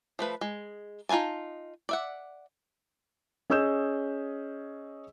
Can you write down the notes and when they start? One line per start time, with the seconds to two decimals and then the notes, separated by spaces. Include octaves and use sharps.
0.19 F3 A3 B4
0.41 G#3
1.09 D#4 F4 C5 G#5 A5
1.89 D5 E5 F#5
3.50 C#4 G#4 D#5 E6 G6 E7